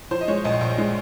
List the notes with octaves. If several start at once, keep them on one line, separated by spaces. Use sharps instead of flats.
F3 C5
D#5
G#3 C#5
A#1 D#5
A#1
G#3